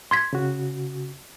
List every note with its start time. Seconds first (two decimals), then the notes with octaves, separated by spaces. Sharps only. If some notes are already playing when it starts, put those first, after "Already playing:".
0.11 C6 G#6 B6
0.33 C#3 F#4